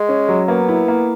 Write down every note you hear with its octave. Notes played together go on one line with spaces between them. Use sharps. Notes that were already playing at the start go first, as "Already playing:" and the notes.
Already playing: G#3
C#4
F#3
A#3 B3
E4
A#3